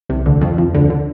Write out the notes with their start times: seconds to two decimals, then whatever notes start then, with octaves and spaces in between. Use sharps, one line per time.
0.09 C2 C3
0.26 D2 D3
0.41 F2 F3
0.58 F2 F3
0.74 D2 D3
0.90 D3